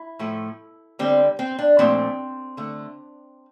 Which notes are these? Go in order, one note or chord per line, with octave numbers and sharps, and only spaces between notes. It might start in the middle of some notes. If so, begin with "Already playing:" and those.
Already playing: E4
A2 F3 A3
D3 G3 C4
C4
D4
A#2 F3 A3 C4
D3 A3